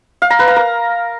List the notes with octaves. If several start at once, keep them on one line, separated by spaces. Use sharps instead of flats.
F5
A#5
B4
A#5
A#4